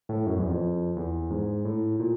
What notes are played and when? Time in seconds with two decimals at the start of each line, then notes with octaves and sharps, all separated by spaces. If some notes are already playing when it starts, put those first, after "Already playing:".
0.09 A2
0.26 F#2
0.38 E2
0.49 F2
0.96 E2
1.31 G#2
1.65 A2
2.00 A#2